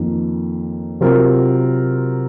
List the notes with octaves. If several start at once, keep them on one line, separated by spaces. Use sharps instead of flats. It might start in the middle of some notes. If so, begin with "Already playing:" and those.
Already playing: F2 D#3 A#3 F4
C3 F#3 C4 F4 A#4